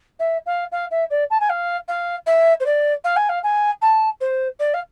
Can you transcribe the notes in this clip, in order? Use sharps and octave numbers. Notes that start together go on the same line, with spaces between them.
E5
F5
F5
E5
D5
A5
G#5
F5
F5
E5
C5
D5
F5
G#5
F5
G#5
A5
C5
D5
F5